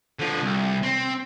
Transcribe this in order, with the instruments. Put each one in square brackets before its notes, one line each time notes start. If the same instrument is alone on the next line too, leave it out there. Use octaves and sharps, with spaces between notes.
[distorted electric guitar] D3 F3
C2
C4